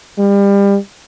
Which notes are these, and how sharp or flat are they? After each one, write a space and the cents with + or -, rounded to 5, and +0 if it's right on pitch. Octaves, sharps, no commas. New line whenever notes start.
G3 +30